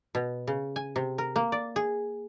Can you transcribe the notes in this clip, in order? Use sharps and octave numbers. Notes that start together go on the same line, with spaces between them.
B2
C#3
G#5
C3
A#4
A#3
D5
G#4